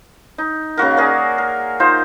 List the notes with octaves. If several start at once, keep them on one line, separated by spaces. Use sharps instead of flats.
D#4
C#3 A#3 F#4 A#4
G#4 A#4 D5
A#4
D#4 F4 C5